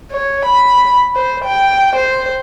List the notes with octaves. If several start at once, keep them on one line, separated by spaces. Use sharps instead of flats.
C#5
B5
C5
G5
C5